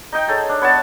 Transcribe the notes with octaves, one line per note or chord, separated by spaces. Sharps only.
D#4 D#5 G5
G#4 A4 C#5
D4
B3 C#5 F#5 A5